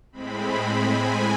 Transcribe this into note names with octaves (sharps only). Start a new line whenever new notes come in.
A2 G#3 C4 B5
G#5